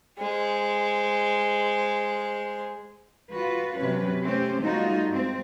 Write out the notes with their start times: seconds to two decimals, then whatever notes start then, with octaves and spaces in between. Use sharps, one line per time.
0.19 G#3 C5
3.31 F4 F#4 B4
3.77 C3 F#3 C#4 B4
4.24 A3 C4 C#4 G4 C5
4.61 G3 A3 B3 D#4 F4 F#4
5.10 G#2 C4